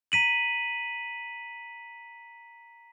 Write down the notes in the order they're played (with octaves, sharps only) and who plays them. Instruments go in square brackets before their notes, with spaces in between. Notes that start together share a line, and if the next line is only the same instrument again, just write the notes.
[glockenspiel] A#5 B6 D#7 F#7